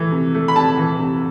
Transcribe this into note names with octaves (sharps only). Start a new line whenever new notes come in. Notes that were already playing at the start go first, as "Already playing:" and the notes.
Already playing: E3 A3
C3
A3
B5
C3 A5
E3
C3